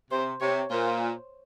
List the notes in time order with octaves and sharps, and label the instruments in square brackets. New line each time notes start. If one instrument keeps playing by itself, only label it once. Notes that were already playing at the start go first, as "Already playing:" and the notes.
[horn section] C3 [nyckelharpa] C5
[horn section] C3 [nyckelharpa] C#5
[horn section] A#2 [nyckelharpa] C5